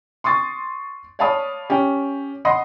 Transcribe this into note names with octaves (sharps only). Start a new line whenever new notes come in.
C6 C#6 D#6 A6
C#5 D5 F5 A5 B5 D#6
C#4 G4
D#5 F#5 B5 C6 D#6